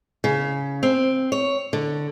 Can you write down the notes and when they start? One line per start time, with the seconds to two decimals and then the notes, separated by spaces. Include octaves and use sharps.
0.24 C#3
0.83 C4
1.32 C#5
1.73 D3